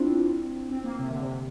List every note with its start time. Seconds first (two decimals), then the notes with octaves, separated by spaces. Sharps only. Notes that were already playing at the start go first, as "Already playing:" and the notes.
Already playing: C4 D4 E4 F4
0.69 C4
0.84 A#3
0.99 C3
1.10 D3
1.21 C3